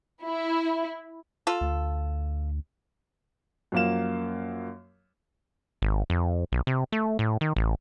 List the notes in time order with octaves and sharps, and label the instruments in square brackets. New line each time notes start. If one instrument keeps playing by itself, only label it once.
[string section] E4
[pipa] F4 A4
[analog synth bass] D2
[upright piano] F#2 F3 A#3 F5 E7
[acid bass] G#1
F2
B1
C3
A3
A2
D#3
A1